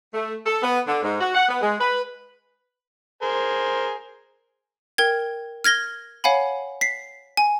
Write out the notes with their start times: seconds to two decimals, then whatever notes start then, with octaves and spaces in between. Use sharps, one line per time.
0.14 A3
0.46 A4
0.63 B3
0.87 D3
1.03 G#2
1.21 F#4
1.34 F#5
1.49 B3
1.61 G#3
1.80 B4
3.22 G#4 A#4 C5
4.98 A#4 G5 G#6
5.64 F6 G#6 A#6 G7
6.24 C#5 F5 F#5 G#5 B5
6.81 B6 C7
7.37 G#5